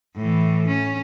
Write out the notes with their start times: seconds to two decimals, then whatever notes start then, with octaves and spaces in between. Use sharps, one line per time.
0.16 A2 E3
0.68 C#4